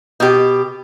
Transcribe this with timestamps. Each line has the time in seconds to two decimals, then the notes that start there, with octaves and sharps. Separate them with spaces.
0.20 B2 G4